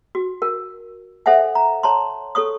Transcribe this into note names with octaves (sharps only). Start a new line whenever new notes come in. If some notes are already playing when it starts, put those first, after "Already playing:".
F#4
A#4
A4 C5 E5 F#5 G#5
A#5
C#5 A5 A#5 C6
A4 C#5 C#6 D#6